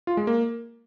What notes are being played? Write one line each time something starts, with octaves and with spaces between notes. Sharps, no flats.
F4
G#3
A#3